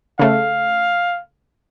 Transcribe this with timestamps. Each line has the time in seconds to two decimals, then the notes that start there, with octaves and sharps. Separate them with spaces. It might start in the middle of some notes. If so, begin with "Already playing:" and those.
0.19 C#3 A3 F5